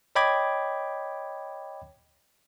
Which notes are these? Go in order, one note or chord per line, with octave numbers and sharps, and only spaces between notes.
C#5 D#5 G5 B5 D6 G#6